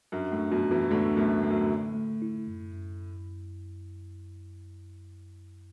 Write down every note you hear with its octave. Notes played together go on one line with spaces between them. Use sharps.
F#2 D4
A2
D4
F#2 B2
E2
B2 E3
D2 A2 D3
F#2 B2 A3
A2 D3
F#2
A2
D3
A3
E4
F#2
F#2